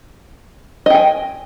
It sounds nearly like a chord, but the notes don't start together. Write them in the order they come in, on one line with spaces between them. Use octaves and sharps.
D#5 G5 G#5